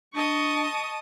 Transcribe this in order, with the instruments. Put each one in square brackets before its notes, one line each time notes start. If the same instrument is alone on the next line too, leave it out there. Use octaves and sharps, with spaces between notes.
[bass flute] D4 [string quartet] D#5 A5 D#6 [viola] C#6